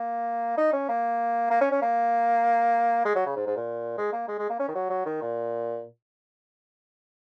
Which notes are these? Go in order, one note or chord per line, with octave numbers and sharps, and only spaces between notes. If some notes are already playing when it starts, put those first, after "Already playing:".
Already playing: A#3
D#4
C#4
A#3
A#3
C#4
C#4
A#3
G#3
F#3
C#3
G#2
G#2
A#2
G#3
A#3
G#3
G#3
A#3
C#4
D#3
F#3
F#3
D#3
A#2